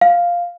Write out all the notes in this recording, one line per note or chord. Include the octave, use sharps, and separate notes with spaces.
F5